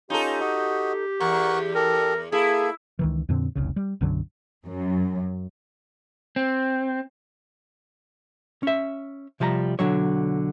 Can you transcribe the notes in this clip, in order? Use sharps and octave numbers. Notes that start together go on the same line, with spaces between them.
C#4 D#4 F4 G4 A4
F#4 D#5
E2 A#4 F#5 C#6
G4 A4 A#4
A#3 E4 G#4 A4
C#2 D#3 E3
F2 A#2 D3 C4
F1 C2 C#3
G3
B1 F#2 D3 F#3
F#2
C4
C#4 E5
C3 F3 G3 A5 A#5
B1 F#2 D3 F#3 C#5